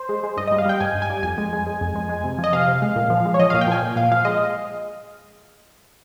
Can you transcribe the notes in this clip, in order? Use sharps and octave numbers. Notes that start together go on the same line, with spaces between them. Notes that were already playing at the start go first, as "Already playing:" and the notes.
Already playing: C5
G#3
G#3
G2 D#5
G3 D#5
F5
G3 G5
G2 G#5
G2
G#5
G3
F2 G#5
G#3
G#3
G#3
F2
G#3
G#3
C3
F3
D#5
C3 F5
C3
G#3
A#2
F3
G#3
C#5
F3 D#5
A#2 F5
G5
F3 G#5
A#2
A#2 F5
F3 F5
G#3 D#5